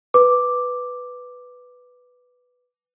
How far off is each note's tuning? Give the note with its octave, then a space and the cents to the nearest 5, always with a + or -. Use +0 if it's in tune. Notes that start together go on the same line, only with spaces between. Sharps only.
B4 +0 D6 +0